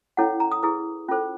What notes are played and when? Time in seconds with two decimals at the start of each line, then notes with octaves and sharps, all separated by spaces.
0.17 C#4 E4 A4 C#5 F#5
0.40 A#5
0.52 D#6
0.63 E4 G#4 B4 D#6
1.08 C#4 F4 A4 C5